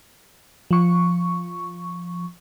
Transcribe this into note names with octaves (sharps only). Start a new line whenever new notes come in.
F3 C#6